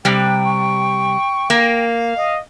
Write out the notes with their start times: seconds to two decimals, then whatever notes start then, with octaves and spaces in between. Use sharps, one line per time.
0.05 C3 G3 G5
0.46 C#6
1.50 A#3 F5
2.16 D#5